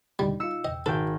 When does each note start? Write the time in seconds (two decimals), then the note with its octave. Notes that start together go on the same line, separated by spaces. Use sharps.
0.19 D#2 D3 G3 D#4
0.40 D#4 F4 E6 C#7
0.65 E2 D#5 G5
0.86 G#1 D#4 F#4 A4 A#4 G5